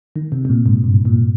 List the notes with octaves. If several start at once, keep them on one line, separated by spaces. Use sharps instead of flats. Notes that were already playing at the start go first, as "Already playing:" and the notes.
D#3
C3
C3
A#2
G#2
G2
A#2